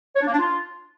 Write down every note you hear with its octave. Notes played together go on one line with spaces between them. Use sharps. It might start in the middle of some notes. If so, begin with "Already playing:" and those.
C#5
D4
A#3
D4
F4